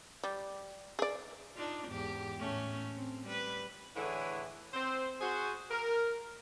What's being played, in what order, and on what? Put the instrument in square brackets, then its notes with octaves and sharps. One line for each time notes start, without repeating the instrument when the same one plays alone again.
[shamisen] G3
G#4 D5
[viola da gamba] D4 D#4 F4
E2 G#2 G4
A2 A3 C#4
C4
G3 B4
[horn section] A2 D3 E3 E4 G#4 C#5
C4 C5
F#4 G#4 C5
A#4